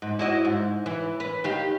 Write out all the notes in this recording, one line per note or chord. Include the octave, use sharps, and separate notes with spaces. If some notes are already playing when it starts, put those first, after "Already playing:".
G#2
E4 F#4 D#5
G#2
E3
B4
D#3 G4 F5